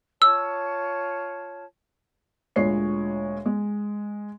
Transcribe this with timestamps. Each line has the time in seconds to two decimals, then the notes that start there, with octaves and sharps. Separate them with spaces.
0.22 F4 C#5 A5 E6
2.56 D2 A#2 G#3 C#5 C7
3.46 G#3